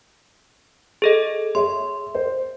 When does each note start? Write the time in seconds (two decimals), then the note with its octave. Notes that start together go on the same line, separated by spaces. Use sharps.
1.02 G#4 A4 D#5
1.55 G#4 C#5 E5 C6
2.15 C5